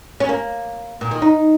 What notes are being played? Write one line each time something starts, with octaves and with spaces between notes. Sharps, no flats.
C#4
A#3
A#2
D#3
D#4